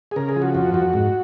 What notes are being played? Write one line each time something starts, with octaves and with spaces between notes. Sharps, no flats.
G#4
C#3 A#4
G#4
F3
F#4
F2 F#4
F2 F#4
G#2